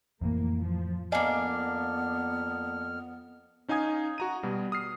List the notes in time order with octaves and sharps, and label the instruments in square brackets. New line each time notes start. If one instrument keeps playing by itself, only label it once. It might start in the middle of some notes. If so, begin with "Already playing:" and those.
[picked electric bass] F2 A2 E3 [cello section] A#3
[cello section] F3
[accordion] F2 F6 [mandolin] A#3 D4 [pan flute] B3 [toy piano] D5 D#5 G#5
[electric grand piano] C#4 D#4 F5 G#5 D#6 G#6
F#4 A#5 D#7
B2 G3
D#6 F6 C7